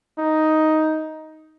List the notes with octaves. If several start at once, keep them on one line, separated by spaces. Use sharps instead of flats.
D#4